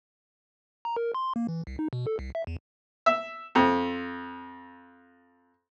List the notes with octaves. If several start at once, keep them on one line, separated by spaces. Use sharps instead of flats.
A#5
A#4
C6
A#3
E3
C2
D#4
B2
A4
C2
E5
E2
E5
F2